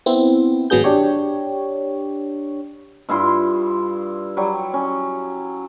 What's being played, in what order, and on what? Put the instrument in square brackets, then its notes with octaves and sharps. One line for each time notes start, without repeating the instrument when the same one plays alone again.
[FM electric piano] B3 C4 E4
G#1 B2 F#3 B3 G#4 G6
D4 G4 C#5
[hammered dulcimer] G2 E4 F4 C6
F#3 G3
C#4